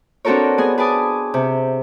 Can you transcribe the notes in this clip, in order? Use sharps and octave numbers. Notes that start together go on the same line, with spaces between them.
C4 D4 F#4 A4 A#4 C#5
B3 G#4 G#5
G#4 B4 G#5 A5 D6 D#6
C3